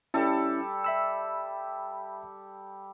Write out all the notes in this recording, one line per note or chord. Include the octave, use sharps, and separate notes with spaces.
G3 C#4 E4 A4
E5 B5 E6